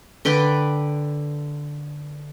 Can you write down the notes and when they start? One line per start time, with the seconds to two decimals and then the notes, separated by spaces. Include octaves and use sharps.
0.25 D3 B4 G5 D6